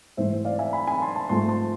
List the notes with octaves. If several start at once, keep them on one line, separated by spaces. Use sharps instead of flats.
G#2 E3 A3 C5 E5
D5 F5
E5 G#5
G#5 B5
G#5 B5
A5 C6
A5 C6
G#2 F3 A3 A5 C6
A5 C6